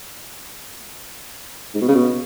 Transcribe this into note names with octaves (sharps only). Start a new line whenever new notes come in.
G#2
B2
C#3
B2